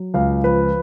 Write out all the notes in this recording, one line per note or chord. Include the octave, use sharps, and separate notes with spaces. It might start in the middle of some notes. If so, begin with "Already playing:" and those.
Already playing: F#3
C#2 F5
F3 B4